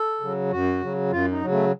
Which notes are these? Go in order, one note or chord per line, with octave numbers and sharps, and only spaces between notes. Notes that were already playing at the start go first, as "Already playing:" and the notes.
Already playing: A4
C#3 F#3
F#2 F#4
C#3 F#3
F#2 F4
D#4
C#3 F#3
A3